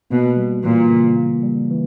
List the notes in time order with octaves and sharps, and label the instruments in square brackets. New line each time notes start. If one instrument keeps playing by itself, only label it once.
[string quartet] B2 [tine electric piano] A#3
[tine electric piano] G3
[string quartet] A#2 [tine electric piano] E3
[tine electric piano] C#3
A#3
G3
E3